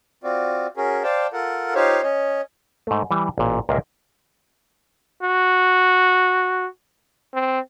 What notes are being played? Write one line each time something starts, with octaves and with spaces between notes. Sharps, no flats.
C4 F4 F#4 D5
C#4 F#4 G#4 A#4
C5 D5 F5 G5 A5
F4 A4 A#4 F#5
D#4 F4 G4 C5 C#5 F5
C#4 C#5 D#5
G#2 A3
E3 G3
A1 A#2
C#2 A#2 A#4 E5 F5 A#5
F#4
C4